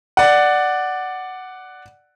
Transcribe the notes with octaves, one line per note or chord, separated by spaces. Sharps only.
D5 F#5